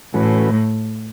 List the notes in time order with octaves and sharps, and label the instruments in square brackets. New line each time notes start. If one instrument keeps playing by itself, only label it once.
[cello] A2 [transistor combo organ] E3 A3 C#4 F#4 B4